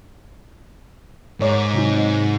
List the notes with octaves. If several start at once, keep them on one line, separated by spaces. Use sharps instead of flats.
G#2 A#4 C#5 D6
C3 F#3 D#4